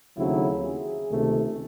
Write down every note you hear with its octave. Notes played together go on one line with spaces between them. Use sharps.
D#2 C#3 F#3 A3 C4 E4
G#4
C#2 C3 D#3 A3